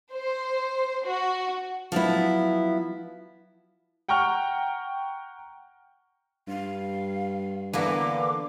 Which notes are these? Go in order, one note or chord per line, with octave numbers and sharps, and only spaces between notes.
C5
F#4
F3 F#3 B3 E4
F#5 G5 A#5 C#6 F6
G2 F5
D3 E3 A#3 B3 D6